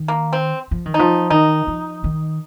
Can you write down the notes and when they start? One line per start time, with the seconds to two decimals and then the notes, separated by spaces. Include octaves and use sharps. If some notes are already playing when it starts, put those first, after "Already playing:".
Already playing: D#3
0.08 A#3
0.33 C4
0.71 F3
0.86 D#3
0.94 D#4
0.99 F3
1.30 D#3 D#4
1.67 F3
2.04 D#3